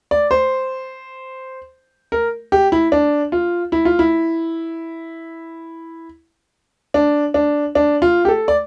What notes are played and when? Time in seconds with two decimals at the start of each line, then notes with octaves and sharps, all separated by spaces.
0.11 D5
0.31 C5
2.12 A#4
2.52 G4
2.72 E4
2.92 D4
3.32 F4
3.72 E4
3.85 F4
3.99 E4
6.94 D4
7.34 D4
7.75 D4
8.02 F4
8.25 G4
8.28 A4
8.48 D5